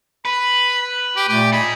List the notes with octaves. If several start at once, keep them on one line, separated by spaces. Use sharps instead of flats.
B4 B5
G4
A#2 A3 G4
D#4 G#4 B5